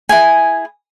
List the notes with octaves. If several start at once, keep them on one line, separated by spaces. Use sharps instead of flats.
E4 G#4 G#5